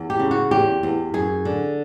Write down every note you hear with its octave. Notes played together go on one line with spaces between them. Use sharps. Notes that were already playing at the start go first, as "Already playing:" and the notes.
Already playing: E2
G4
C#3
F#4
E2 G4
E2
F#2 G#4
D3